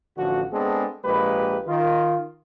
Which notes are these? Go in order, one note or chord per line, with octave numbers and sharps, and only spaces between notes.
A1 D3 F3 F#4
G#3 B3 C4 D4 G#4 A4
A#1 G#3 A#3 G4 B4
D#3 F4